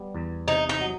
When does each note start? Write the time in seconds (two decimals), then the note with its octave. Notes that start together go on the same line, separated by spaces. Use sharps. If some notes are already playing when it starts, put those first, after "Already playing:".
Already playing: G3 B3
0.15 E2
0.48 C3 D#4
0.69 D#4
0.81 F#3